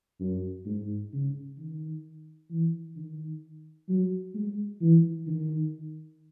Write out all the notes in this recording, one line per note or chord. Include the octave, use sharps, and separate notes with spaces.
F#2
G#2
C#3
D#3
E3
D#3
F#3
G#3
E3
D#3